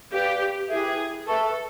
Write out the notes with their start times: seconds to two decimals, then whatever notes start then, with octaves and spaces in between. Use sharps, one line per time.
0.12 G4 B4 D5 F5
0.69 E4 G4 G#4 B4 E5
1.26 A4 B4 E5 A5 C#6